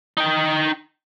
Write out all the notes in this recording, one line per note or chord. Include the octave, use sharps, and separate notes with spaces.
D#4 G5